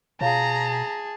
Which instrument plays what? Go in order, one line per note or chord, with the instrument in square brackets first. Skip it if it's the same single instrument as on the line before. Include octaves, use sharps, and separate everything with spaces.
[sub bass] B2 [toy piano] F4 C#5 F5 [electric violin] G#4 A5 [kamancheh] A#5